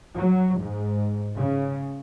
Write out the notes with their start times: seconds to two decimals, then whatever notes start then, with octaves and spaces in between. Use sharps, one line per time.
0.16 F#3
0.60 G#2
1.36 C#3